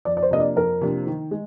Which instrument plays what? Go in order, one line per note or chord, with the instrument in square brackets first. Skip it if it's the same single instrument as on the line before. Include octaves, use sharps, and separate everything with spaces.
[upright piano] F2 [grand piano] D5
[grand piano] D5
C5
[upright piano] C3 F3 A#3 D4 [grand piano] D#5
[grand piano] D5
[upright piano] F2 [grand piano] A#4
[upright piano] C3 F3 A#3 D4
D#3
G#3